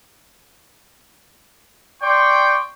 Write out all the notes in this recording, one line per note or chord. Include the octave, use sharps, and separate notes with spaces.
D5 G5 C6 C#6